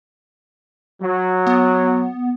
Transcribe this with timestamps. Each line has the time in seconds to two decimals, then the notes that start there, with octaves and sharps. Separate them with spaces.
1.02 F#3
1.47 B3